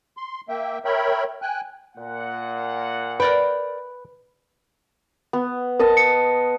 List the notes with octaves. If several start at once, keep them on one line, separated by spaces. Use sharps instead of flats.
C6
A#3 E5 G5
A#4 C#5 E5 G5 B5
G5 G#5 F#6
A#2 F#5
A#4 B4 D5 G5
B3
A#4 B4 D#5 A5
C#7